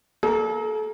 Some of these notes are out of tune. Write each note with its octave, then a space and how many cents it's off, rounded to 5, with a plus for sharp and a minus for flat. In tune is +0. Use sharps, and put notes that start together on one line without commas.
A#3 +0 A4 -35